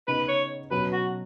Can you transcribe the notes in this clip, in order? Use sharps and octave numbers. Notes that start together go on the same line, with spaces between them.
C#3 B3 D#4 B4
C#5
B2 F#3 C#4 B4
F#4